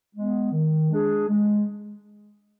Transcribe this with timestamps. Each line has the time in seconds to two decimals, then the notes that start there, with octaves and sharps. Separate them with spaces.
0.15 G#3 B3
0.52 D#3
0.90 G#3 D4 G#4
1.28 G#3